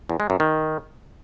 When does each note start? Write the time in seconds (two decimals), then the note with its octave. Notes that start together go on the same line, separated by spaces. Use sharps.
0.09 E2
0.20 G#3
0.30 F#2
0.40 D#3